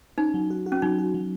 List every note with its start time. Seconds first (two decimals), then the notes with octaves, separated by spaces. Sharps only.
0.18 C#4 D#4
0.34 F#3
0.50 F#4
0.66 F#4
0.72 C#4
0.82 F#3 D#4
0.99 F#4
1.14 F#3